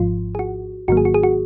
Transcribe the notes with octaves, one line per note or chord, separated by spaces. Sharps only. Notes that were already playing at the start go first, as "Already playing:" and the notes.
Already playing: G#1 G#2 F3 F4
G#4
F#4
G#1 G#2 D#3 F#3 A#3 F#4
G#4
F#4
G#4
F#4